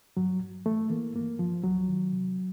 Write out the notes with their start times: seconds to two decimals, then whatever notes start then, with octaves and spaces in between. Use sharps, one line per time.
0.17 G2 F#3
0.42 G2
0.66 E3 A3
0.90 E3 A#3
1.15 G2 A#3
1.39 G2 F3
1.64 C2 F#3
1.88 D#3
2.12 C3